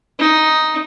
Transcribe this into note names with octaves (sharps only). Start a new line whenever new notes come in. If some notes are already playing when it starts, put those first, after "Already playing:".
D#4